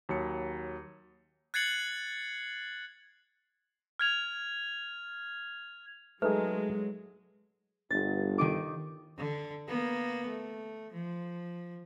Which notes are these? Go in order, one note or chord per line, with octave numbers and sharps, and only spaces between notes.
D#2 F#3 C#7
F#6 G#6 A6 C7 C#7 F#7
F6 G#6 F7
F#3 G#3 A3 D#4 G#4 B4
G1 A6
D#3 D#4 D6
D3
A#3 B3
A3
F3